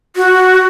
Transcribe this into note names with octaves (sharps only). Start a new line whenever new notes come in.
F#4